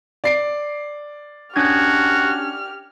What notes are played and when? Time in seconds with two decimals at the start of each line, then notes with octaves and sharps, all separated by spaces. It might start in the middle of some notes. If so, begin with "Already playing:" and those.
0.24 D5 C7 D7
1.56 C#4 D4 F#4 G4 F6 G#6